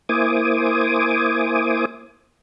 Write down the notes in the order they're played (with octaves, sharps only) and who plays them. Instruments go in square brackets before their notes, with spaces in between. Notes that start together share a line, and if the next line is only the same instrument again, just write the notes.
[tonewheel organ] A#3 E4 C5 G#5 D6 D#6